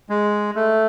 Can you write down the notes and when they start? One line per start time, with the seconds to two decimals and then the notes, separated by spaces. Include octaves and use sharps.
0.10 G#3
0.56 A3